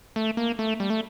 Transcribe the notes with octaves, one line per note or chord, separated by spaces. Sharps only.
A3
A#3
A3
G3
A3